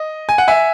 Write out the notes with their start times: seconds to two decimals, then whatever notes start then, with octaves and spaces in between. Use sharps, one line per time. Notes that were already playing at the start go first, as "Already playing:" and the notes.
Already playing: D#5
0.29 G#5
0.38 F#5
0.48 E5 G#5